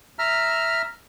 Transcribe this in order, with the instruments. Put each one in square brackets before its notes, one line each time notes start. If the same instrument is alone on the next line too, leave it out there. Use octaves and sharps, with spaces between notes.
[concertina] E5 A#5 F6